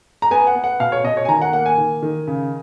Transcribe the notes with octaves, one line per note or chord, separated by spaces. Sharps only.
A#5
B3 G#5
F#5
B3
F#5
B2 F5
C#5
B2 D#5
C#5
G#5
D#3 A#5
F#5
A#3 F#5
G#5
D#3
D#3
C#3